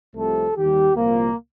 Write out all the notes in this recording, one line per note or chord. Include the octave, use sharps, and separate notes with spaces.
C2 C3 F3 A3 A4
D#2 D#3 G3 G4
C2 A#2 F3 A#3